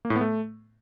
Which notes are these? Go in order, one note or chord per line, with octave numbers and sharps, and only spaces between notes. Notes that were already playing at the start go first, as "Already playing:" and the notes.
A#3
A2
B3
A3